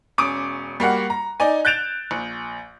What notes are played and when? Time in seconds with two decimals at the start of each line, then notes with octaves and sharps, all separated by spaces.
0.18 E1 C#4 D6 D#6 D7
0.80 G3 A#3 F#4 F#5
1.10 A#5
1.40 D#4 D5 G#5
1.65 F#6 G6 A6 D7 E7 F7
2.11 A#1